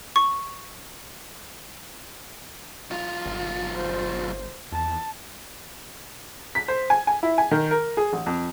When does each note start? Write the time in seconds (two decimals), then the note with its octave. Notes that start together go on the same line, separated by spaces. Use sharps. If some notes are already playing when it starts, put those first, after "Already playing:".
0.16 C#6
2.91 B1 F4
3.26 G1
3.75 C5
4.72 E2 A5
6.55 B6
6.68 C5
6.90 G#5
7.07 G#5
7.23 E4
7.38 G#5
7.51 D#3
7.71 A#4
7.97 G#4
8.13 A1
8.26 F2